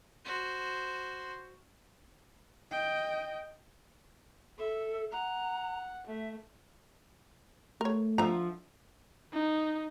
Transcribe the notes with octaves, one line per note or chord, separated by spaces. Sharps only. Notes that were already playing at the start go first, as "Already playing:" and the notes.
F#4 C5
D#5 G5
A4 E5
F#5 A#5
A3 E5
A3 A#4 C#5
D3 F3 F4 E5 A#5
D#4